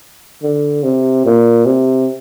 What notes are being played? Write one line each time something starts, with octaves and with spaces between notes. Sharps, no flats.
D3
C3
A#2
C3